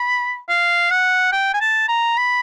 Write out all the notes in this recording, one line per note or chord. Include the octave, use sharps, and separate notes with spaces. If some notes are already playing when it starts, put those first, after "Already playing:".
Already playing: B5
F5
F#5
G5
G#5
A5
A#5
B5